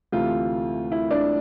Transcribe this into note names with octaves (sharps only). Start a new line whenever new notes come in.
D2 C3 E3 A3 F4
E4
D4